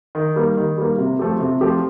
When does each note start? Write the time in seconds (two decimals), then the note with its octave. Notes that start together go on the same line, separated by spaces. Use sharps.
0.15 D#3
0.36 G3 A#3
0.57 D#3
0.78 G3 A#3
0.98 C3
1.19 F3 A3 C4 G4
1.40 C3
1.61 F3 A3 C4 G4